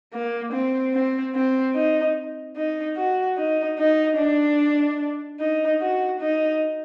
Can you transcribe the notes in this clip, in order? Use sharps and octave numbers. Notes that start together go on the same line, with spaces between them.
A#3
C4
C4
C4
D#4
D#4
F#4
D#4
D#4
D4
D#4
F#4
D#4